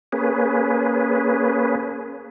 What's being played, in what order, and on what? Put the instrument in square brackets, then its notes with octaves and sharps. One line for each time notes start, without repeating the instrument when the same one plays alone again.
[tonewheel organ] A#3 C#4 G#4 B4